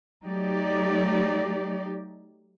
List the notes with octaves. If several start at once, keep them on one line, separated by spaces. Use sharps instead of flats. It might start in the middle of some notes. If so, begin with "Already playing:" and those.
F#3 A3 D#4 G4 D5